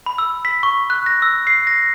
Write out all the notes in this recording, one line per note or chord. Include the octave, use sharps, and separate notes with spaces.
B5
E6
B6
C#6
F#6
A#6
E6
C7
A#6